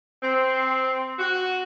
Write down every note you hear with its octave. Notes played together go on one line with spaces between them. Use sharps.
C4
F#4